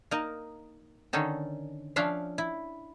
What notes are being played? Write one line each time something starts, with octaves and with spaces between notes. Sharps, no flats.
A#3 D#4 A#4 D#5
D3 D#3 C#4 D#4 A4
F3 C#4 D4 E5 F5
E4